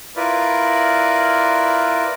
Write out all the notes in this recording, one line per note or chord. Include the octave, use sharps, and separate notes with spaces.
E4 F4 A#4 B4 D5